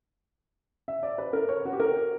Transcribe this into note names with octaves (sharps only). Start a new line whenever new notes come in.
E5
D5
B4
A#4
C#5
F#4
G4
A#4